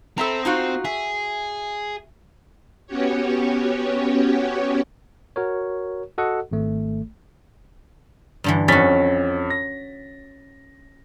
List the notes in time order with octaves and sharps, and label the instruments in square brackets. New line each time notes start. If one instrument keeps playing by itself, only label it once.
[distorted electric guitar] C4 [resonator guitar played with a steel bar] A4 E5 A#5
[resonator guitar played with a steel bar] D#4 F4 F#4
[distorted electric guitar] G#4 [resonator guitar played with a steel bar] E5
[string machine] B3 C#4 F#4 G4 C#5
[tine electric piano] F#4 A#4 C#5
F#4 A4 D#5 F#5
G#1 A3
[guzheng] G2 D3 E3
[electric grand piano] F2 A6 B6 [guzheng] C#4 F#4
[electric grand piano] A#6